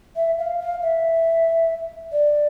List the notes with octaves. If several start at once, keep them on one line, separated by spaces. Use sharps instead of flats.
E5
F5
F5
E5
D5